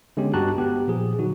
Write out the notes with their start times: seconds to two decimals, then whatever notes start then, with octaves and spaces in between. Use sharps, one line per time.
0.17 D3 G#3 B3 C#4 D4 G4
0.34 G2 F#4 G4 A5 A#5 F#6
0.58 B3 G4
0.88 A#2 F3 G#4
1.19 D3 F#3 D#4 F#4